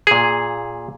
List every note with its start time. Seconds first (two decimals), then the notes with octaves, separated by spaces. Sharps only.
0.07 A#2 G#4